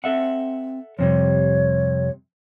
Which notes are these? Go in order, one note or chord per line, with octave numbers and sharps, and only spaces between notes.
C4 A4 E5 F#5
F2 C3 G3 C#5